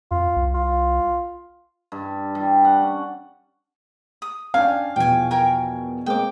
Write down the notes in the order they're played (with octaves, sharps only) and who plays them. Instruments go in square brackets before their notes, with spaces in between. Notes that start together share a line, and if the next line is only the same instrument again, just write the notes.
[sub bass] F2 [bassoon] F4
[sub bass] C2
[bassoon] F4
[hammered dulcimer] G2
G3
F#5
C#4
[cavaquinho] D#6
[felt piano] C#4 D4 G5 [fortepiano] F5 [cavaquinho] G#5
[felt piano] E2 B2 F3 [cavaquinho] G5 G#5
[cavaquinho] A#4 G5 G#5
[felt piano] G#3 A#3 C4 [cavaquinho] G5 D6